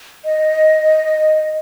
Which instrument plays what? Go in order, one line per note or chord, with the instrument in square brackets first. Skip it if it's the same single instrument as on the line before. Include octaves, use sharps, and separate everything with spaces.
[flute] D#5